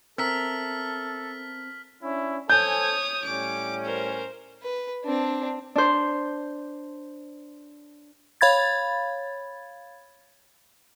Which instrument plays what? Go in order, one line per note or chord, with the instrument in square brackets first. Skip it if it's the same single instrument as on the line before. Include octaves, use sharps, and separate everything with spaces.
[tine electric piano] C4 [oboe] A4 [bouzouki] A#4 E5 [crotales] F6 B6 F#7
[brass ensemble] C#4 D4 E4
[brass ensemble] A4 C5 G#5 [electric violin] C#5 D#6 [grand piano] G6
[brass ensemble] A2 G3 C#4 [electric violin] D6
[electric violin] A#4 C5
[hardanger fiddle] B4
C4 D4
[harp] D4 C5
[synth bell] C#5 F5 B5 G#6 A6